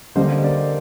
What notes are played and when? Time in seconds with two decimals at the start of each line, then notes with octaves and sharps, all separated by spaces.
0.16 D3 G3 A#3 C5 D#5
0.43 A#4 D5